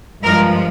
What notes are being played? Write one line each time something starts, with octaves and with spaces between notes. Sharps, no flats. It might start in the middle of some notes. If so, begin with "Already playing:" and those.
G2 F3 G#3 A#4